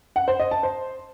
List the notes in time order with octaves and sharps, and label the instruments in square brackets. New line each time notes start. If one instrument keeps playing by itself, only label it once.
[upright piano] F#5
C5
D#5
A5
C5